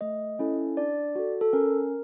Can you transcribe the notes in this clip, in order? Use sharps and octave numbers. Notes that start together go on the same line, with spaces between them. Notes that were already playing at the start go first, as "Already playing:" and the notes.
A3 D#5
C#4 E4 A4
D4 D5
F#4 A4
A4
C#4 A#4